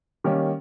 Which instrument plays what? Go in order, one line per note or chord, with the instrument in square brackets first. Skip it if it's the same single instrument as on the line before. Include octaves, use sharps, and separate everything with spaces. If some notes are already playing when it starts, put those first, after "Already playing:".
[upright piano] D#3 G3 A#3 C#4